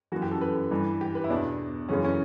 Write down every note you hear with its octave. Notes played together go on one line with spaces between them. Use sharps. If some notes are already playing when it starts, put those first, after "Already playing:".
F#2 E3 F#4
G4
A4
B4
G2 E3
G4
B4
E4
E2 B2 D4
F#2 C#3 E3 C#4
C#4